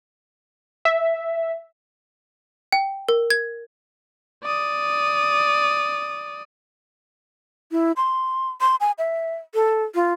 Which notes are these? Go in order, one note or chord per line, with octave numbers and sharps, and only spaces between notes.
E5
G5
A#4
G#6
D5 D#6
E4
C6
C6
G#5
E5
A4
F4